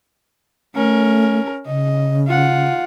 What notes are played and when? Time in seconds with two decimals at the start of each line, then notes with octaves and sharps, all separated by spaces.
0.75 A3 C#4 A#4
1.66 C#3 D#5
2.27 F4 F#5